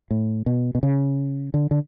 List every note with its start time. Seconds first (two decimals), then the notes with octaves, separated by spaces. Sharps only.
0.11 A2
0.46 B2
0.75 B2
0.83 C#3
1.54 D3
1.71 D3